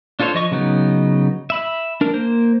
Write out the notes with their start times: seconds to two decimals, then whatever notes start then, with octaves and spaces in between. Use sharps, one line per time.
0.20 D4 F4 A4 C5 C#5
0.34 F3 D#5 C#6
0.51 C#3 F#3 B3 D#4
1.50 E5 B5
2.01 D4 A#4
2.14 A#3 C5